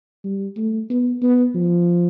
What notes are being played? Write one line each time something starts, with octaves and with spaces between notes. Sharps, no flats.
G3
A3
B3
B3
F3